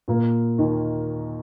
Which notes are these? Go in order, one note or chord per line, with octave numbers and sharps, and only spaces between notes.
A#2 A#3
D#2 D#3